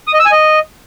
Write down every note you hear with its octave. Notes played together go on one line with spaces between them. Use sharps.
D#6
D#5
E6
G#5
D#5